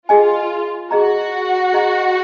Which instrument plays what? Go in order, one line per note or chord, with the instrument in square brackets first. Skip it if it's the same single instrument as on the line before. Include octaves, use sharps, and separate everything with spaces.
[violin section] F4 [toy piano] G#4 D#5 G#5
[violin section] F#4 [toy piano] G#4 D#5 A#5
[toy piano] G#4 D#5 A#5